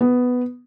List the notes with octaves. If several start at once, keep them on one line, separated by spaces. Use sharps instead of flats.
B3